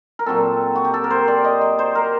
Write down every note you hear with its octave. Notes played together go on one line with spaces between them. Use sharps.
A#4
A#2 F#3 C4 A4
F#4
G4
A4
A#4
C5
D5
D#5
D5
C5
A#4